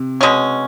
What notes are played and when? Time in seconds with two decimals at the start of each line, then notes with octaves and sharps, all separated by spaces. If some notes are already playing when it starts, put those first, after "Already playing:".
Already playing: C3
0.21 B2 G#3 C#4